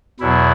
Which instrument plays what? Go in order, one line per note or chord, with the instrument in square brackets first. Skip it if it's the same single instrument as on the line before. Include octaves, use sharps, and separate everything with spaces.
[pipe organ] E2 B2 F#3 E4